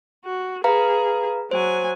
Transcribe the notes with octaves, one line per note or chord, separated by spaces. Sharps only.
F#4
G#4 B4 F5 A#5
F#3 C5 G#5